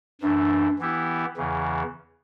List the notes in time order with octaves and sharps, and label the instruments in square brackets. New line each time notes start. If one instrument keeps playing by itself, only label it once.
[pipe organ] F#2 E3 A3 [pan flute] D4
[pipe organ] E3 B3 E4 G4
E2 C#3 E3